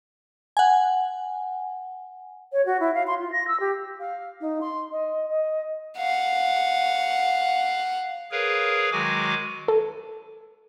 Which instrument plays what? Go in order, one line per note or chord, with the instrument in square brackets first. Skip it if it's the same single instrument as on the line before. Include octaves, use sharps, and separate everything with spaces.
[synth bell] F#5 G#5
[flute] C#5
F#4
E4
F5
C6
F4
A#6
E6
G4
[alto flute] F5
D#4
C6
D#5
D#5
[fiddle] F5 F#5
[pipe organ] G#4 A#4 B4 C#5 F5
D#3 F#3 G#3 F#4 G#5 D6
[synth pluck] A4